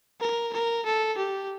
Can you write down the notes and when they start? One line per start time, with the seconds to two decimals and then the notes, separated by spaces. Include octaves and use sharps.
0.20 A#4
0.53 A#4
0.85 A4
1.18 G4